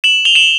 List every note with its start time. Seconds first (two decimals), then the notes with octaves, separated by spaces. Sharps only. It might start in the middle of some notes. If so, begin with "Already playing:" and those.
0.04 E7 F#7
0.25 F7 G7
0.35 E7 F#7